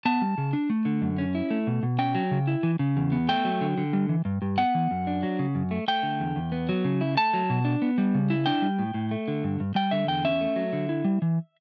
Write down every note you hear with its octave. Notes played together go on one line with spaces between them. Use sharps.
B3 A5
G3
C#3
D4
A3
D3
F#2
C#4
E4
A3
B2
B2
C#4 G5
F#3
C#3
E4
E3
C#3
E2
B3
A3 G5
F#3
D3
D3
G3
E3
G2
G2
B3 F#5
E3
F#2
D4
F#3
C#3
F#2
A3
A3 G5
D3
E2
E2
B3
F#3
C#3
E4
A3 A5
F#3
B2
D4
B3
G3
C#3
E4
D4 G5
G3
A2
A2
A3
D3
G2
G2
G3 G5
D3 E5
E2 G5
C#4 E5
A3
F#3
D3
E4
G3
E3